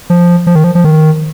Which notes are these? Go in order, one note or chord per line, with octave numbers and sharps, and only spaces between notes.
F3
F3
D#3
F3
F3
D#3